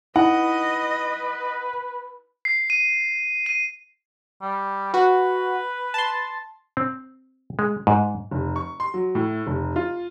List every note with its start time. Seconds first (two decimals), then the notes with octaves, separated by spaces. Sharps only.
0.16 D#4 E4 B4 D#5 F#5 B5
2.45 C7
2.70 D#7
3.46 D#7
4.42 G3
4.94 F#4 B4
5.94 A5 C6
6.77 C4
7.59 G#3
7.87 G#2
8.31 F1
8.56 C#6
8.80 C6
8.94 F#3
9.15 A2
9.47 F1
9.76 F4